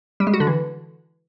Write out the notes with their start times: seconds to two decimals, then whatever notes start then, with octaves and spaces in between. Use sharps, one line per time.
0.20 G3
0.27 G#3
0.34 F#4
0.40 D3
0.47 E3